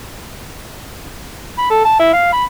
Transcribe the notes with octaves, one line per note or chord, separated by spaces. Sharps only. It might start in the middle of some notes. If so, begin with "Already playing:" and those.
B5
A4
A5
E4
F5
B5